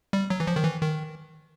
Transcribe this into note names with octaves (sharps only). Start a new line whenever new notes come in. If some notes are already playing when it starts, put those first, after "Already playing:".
G3
F#3
E3
F3
D#3
E3
D#3